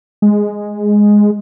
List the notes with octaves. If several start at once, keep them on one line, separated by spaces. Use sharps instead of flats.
G#3